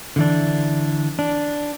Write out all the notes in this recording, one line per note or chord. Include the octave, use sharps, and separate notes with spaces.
D3 E3 D4
D4